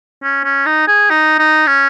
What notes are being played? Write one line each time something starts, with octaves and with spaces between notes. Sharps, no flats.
C#4
C#4
D#4
G#4
D#4
D#4
C#4